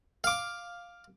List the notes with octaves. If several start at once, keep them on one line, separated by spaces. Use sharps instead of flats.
F5 D6